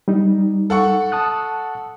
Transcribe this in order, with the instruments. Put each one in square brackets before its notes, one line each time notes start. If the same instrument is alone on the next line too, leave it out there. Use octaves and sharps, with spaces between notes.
[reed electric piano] G3 D#4
[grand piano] A4 F#5 C#6
[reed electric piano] A5 D#6 F#6